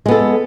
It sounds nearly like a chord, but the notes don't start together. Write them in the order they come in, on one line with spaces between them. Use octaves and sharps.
G#3 B3 A4